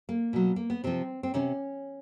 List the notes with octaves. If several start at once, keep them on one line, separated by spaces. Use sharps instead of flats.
A#3
B2 F#3
A#3
B3
C3 F3 C4
C4
C3 D#3 C#4